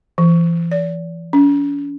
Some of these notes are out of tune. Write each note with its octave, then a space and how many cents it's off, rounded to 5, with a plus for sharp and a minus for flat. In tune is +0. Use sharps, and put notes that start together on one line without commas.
E3 +35
D5 -35
C#4 +45